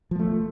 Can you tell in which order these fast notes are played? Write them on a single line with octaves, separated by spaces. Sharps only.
F3 A#3 A3